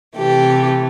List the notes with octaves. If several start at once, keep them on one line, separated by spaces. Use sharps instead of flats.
C3 E3 A3 G4